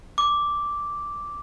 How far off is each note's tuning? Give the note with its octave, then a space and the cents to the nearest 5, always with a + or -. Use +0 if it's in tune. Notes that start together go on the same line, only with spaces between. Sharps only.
D6 -5